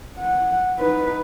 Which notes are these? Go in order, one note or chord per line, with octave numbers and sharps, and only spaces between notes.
F#5
D#4 B4